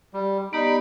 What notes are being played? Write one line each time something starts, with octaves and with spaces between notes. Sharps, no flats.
G3
B3 D#4 G4 D5 B5